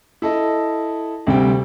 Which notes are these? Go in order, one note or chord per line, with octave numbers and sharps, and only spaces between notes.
E4 A4 D#5
D2 C3 G3 C4 G5